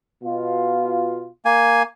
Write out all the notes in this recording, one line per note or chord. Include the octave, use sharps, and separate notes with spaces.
B2 F4
A#3 G#5